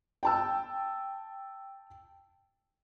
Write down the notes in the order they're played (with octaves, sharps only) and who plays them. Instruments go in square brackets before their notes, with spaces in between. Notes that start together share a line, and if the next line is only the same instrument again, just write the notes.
[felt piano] G5 A5 E6